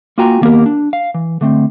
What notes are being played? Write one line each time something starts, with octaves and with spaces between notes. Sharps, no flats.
A#3 F4 F#4 G5 G#5 A#5
D#3 G3 A#3 B3 G4 A#4
D4
F5
E3
D3 A3 C4